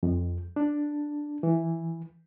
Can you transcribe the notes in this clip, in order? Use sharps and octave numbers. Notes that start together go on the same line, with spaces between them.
F2
D4
E3